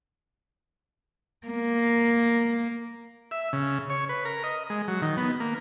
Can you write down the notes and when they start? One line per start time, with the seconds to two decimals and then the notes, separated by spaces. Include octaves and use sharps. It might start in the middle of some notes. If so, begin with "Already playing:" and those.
1.47 A#3
3.31 E5
3.53 C#3
3.90 C#5
4.09 B4
4.25 A#4
4.44 D#5
4.70 G#3
4.88 F#3
5.02 D#3
5.17 B3
5.40 A#3